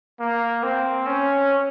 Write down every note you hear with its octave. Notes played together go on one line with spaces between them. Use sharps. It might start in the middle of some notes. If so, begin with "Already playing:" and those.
A#3
C4
C#4